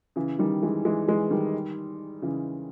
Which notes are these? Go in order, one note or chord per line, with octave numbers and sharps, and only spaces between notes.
C#3 E3
D#3 G3
E3 G#3
E3 G#3
E3 G#3
D#3 G3
C#3 E3